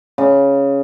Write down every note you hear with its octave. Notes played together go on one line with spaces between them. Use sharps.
C#3